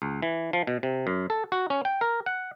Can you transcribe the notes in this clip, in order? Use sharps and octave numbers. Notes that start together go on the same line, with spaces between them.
C#2
E3
F3
B2
C3
F#2
A4
F#4
C#4
G5
A#4
F#5